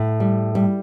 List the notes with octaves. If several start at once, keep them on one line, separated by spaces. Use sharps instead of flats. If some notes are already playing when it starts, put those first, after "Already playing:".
Already playing: A2
G3
G3